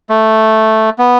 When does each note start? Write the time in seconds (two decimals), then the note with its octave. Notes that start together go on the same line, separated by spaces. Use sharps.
0.09 A3
0.98 B3